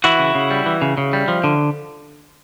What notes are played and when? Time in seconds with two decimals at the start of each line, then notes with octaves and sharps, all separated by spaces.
0.04 E3 E4 F#4
0.19 C#3
0.35 C#3
0.50 G3
0.66 E3
0.82 C#3
0.98 C#3
1.13 G3
1.28 F3
1.44 D3